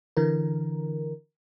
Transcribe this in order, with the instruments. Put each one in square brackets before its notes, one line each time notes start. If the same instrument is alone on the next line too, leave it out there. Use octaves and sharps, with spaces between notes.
[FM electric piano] D3 E3 A#4